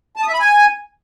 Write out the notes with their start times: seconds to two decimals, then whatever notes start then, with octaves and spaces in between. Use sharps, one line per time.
0.16 A5
0.22 D#6
0.28 E5
0.34 B5
0.40 G#5